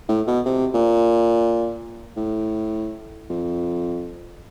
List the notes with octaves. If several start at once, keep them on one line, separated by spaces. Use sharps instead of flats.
A2
B2
C3
A#2
A2
F2